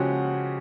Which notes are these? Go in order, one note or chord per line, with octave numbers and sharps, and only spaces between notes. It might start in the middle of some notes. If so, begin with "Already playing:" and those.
Already playing: C#3 F3 G#3 C#4 F#4 G4 F#5